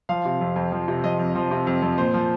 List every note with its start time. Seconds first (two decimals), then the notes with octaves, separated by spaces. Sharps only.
0.09 F3 F5
0.25 C3
0.41 F2
0.56 F2
0.72 F3
0.88 C3
1.04 F2 D#5
1.19 F2
1.35 F3
1.51 C3
1.67 F2
1.82 F2
1.98 A#2 C5
2.14 F3